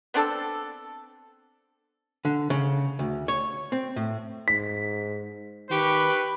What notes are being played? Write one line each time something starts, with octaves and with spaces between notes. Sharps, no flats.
B3 C4 D4 A4
D3
C#3
D2
C#5
C4
A2
G#2 B6
D#3 G4 B4 C#6